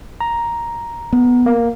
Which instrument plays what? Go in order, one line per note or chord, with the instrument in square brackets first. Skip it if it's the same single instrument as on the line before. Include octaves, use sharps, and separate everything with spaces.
[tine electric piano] A#5
[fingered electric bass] B3
[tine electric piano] A#3